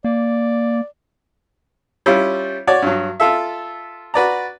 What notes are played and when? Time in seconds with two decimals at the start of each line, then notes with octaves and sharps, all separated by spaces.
0.04 A#3 D5
2.06 G3 C#4 E4 F4
2.67 F#4 C#5 D5
2.82 G2 F#3
3.20 F4 A4 E5
4.14 F#4 B4 D5 A#5